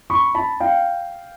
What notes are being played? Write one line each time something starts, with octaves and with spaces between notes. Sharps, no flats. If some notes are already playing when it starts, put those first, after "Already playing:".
B5 C#6
A5 B5
F5 G5